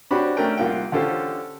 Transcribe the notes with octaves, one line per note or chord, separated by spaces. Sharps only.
C4 D4 F#4 G4 C#5 B5
A3 C#4 D4 A#4 G5
C2 A#3 F4 F#5 G5
D3 C#4 F4 G4 A4 C5